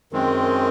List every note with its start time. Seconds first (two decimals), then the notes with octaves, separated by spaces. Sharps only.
0.12 F#2 D#3 G#3 C4